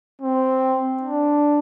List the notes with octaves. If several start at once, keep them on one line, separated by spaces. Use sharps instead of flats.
C4
D4